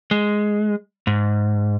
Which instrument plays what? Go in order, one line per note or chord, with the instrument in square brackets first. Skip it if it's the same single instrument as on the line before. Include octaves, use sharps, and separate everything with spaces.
[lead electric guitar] G#3
G#2